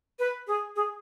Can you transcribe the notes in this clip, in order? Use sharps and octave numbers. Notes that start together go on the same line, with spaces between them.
B4
G#4
G#4